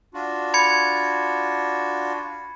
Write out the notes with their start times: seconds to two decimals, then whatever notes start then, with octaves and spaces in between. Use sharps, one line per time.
0.14 D4 F4 F#4
0.54 B5 G#6 C#7